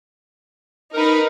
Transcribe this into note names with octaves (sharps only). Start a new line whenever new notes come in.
D#4 A#4 B4